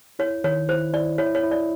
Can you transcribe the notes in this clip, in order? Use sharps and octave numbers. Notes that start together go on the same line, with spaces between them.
E4 C#5
D#3 C#5
E4 C5
E4 D5
E4 C#5
C#5
E4
D5